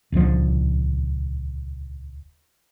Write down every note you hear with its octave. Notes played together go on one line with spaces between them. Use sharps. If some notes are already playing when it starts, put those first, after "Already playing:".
D#1 C#2 D3 F3